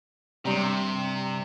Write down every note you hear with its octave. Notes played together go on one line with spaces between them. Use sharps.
G2 C3 A#5